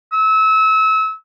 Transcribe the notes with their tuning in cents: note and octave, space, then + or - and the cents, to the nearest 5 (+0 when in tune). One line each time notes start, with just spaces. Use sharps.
E6 -30